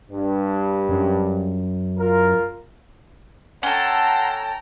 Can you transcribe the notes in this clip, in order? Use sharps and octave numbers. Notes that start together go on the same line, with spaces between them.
G2
F#2
F4 A#4
C#4 A4 F#5 G5 A#5 C6